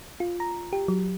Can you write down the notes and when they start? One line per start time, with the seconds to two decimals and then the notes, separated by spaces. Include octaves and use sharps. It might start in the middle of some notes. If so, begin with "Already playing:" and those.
0.20 F4
0.40 A#5
0.73 G4
0.88 F#3